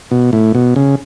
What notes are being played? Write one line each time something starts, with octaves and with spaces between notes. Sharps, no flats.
B2
A2
B2
C#3